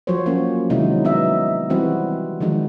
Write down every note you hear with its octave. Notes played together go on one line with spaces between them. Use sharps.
F3 F#3 F4 F#4 C5 C#5
F3 F#3 A#3 C#4
C3 D#3 F#3 G#3 D#4 E4
B3 D#5 E5
E3 G3 C4 F#4 B4
D#3 F3 G#3 D#4 F#4